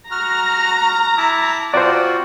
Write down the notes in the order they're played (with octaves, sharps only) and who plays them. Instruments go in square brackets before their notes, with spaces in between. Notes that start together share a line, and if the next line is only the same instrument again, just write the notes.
[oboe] F#4 [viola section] A#5 [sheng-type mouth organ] F6
[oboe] E4 [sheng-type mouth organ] A5 D6
[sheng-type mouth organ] C4 F4 [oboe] F#4 [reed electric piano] C5 D5